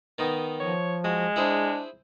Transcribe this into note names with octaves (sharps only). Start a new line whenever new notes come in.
D#3 B3 D#4
F3 C#5
G#3 F#4
D4 E4 G#4 C5